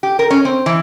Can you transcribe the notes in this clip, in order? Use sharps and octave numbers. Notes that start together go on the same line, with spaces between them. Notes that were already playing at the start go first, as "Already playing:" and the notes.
G4
A#4
C#4
C4
E3